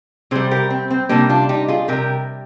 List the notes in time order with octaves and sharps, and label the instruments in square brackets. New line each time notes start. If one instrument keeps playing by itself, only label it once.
[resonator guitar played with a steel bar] C3 G3 G#4 C5
G4 A#4
C4
C4
C3 G3 A#3 D4
D4 F4
D#4 G4
F4 G#4
C3 G3 G4 A#4